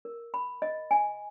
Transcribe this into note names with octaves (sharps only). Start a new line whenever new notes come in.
A#4
B5
D#5
G#5